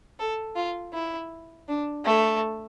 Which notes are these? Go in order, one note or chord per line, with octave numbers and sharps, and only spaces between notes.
A4
F4
E4
D4
A3